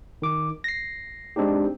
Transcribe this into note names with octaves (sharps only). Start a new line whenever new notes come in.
D#3 D6
A#6 C7
G#3 C4 D4 D#4 G4